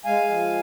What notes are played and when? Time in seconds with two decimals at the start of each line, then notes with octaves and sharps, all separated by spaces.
0.05 G#3 F5 G#5
0.29 F3